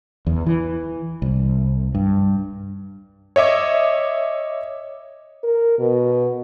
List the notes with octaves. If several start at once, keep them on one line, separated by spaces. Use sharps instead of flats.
E2
E3
C2
G2
C#5 D#5 E5 D6
A#4
B2